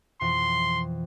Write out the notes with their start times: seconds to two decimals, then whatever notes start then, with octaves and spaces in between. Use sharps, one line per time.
0.21 F2 B2 E3 C6